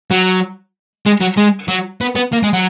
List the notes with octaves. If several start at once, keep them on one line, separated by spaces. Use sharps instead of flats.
F#3
G#3
F#3
G#3
F#3
B3
B3
A#3
G#3
F#3